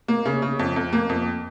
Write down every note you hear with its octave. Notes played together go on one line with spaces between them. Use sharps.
A#3
C#3
C#3
F2
F2
A#3
F2